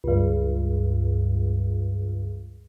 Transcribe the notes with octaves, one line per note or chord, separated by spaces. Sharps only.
C#2 G2